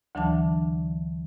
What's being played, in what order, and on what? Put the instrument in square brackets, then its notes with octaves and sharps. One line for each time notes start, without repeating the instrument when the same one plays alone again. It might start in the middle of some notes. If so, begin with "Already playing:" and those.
[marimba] D2 D3 E3 F#3 D4 A5